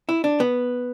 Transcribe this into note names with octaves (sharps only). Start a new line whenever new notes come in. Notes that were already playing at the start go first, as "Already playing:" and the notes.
E4
D4
B3